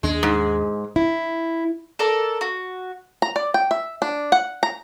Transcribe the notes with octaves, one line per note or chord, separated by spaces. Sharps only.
D#2 G#3 D4
G#2
E4
A4 A#4 D5 A#5
F#4
A#5
D5
G5
E5
D4
F#5
A#5